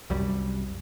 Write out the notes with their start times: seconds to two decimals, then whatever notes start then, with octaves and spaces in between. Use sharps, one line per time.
0.10 C2 F#2 G3